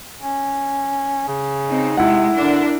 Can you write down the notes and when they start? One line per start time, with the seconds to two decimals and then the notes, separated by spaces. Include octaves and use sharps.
0.21 C#4
1.28 C#3
1.67 C4 D#4
1.97 C3 G#3 E4 F#5
2.35 D3 D4 A#4